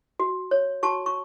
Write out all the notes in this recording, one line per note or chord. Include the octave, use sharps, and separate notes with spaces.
F#4
C#5
F#4 A5 C#6
C#6